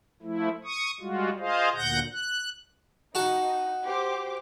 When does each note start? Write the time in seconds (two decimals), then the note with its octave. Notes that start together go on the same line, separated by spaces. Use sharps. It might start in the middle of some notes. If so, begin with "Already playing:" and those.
0.22 F3 A3 E4
0.64 C#6 D#6
1.00 G3 G#3 F4 F#4
1.39 F4 G#4 C5 D#5 F5
1.75 D2 A#2 F#5 G6 A#6
2.12 F#6
3.15 D#4 F#4 A5
3.85 G4 C5 D6